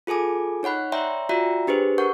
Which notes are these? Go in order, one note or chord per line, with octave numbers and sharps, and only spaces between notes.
F4 G#4 A4 G#5 D6
D#4 C#5 F#5 B5 F#6
C#5 D5 E5 G5 A#5 C6
F4 F#4 D5 E5 G5 A#5
D4 G4 G#4 B4 C5
A#4 F#5 C#6 G6